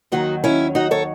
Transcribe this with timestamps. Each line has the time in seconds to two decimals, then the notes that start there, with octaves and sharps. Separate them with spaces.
0.12 D#2 D#3 F#3 D#4 F#4
0.44 C#4 E4
0.75 D#4 F#4
0.91 A4 C#5